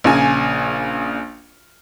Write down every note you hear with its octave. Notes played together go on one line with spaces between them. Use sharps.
A#1 C#3 G#5